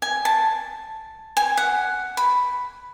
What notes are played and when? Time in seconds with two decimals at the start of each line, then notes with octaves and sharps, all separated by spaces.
0.02 G#5
0.25 A5
1.37 G#5
1.57 F#5
2.17 B5